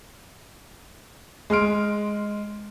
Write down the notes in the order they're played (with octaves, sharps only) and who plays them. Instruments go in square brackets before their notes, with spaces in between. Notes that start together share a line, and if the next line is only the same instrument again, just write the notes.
[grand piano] G#3 C6 F6 D7